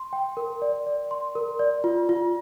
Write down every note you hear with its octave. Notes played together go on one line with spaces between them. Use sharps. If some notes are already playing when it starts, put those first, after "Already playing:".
Already playing: C6
G5
A#4
D5
D5
C6
A#4
D5
F4
F4